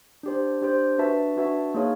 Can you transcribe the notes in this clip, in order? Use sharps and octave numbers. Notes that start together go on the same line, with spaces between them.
D4 G4 C5
D4 G4 C5
D4 F#4 B4 E5 A5
D4 F#4 B4 E5 A5
A#3 D#4 G#4 C#5 F5